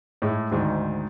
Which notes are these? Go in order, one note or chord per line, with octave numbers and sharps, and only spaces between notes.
A2 G#3
D2 G#2 D#3